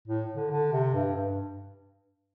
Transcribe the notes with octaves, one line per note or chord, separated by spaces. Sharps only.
A2
D3
D3
C3
G2
G2